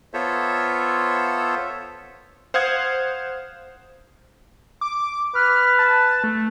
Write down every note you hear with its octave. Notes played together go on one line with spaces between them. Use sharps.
B3 F4 A4 C5 C#5 E5
C5 F5 F#5 D#6 G#6
D6
B4 F6
A5
A3